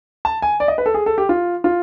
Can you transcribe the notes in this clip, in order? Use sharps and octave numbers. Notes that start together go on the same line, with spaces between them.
A5
G#5
D5
D#5
B4
A4
G#4
A4
G4
F4
F4